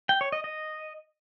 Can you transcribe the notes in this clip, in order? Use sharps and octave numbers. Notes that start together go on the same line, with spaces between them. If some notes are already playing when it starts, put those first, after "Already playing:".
G5
C#5
D#5
D#5